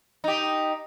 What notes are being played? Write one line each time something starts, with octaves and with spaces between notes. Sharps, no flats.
D#4 G4